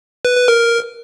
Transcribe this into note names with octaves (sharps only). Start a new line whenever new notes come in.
B4
B4
A#4